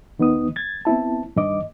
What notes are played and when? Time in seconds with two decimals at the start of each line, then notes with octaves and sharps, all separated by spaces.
0.18 D#2 D#3 B3 D#4 D#6
0.56 G#6 A6
0.85 B3 C4 E4 A5
1.36 G2 D#3 D#5 D6